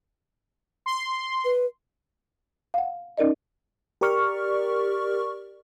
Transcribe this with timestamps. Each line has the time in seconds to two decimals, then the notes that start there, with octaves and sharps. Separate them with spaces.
0.86 C6
1.45 B4
2.74 F5 F#5
3.18 C#4 D#4 A#4 D5 D#5
4.01 G4 A#4 D5 C#6 F6